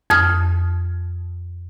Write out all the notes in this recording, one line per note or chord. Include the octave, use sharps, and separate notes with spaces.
F2 D#6 F6